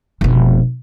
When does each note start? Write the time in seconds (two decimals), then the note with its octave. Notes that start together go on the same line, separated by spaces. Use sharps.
0.21 F1 B2